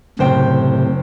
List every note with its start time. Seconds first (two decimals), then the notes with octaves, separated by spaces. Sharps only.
0.19 F#1 A2 C3 C5 G5